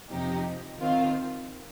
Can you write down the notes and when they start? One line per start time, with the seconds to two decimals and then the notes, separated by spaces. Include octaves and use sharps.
0.10 F2 C3 F3 D#4 G4
0.80 D#3 C4 F4